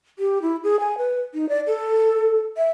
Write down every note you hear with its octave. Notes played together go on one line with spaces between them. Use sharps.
G4
E4
G#4
G#5
B4
D#4
D5
A4
E5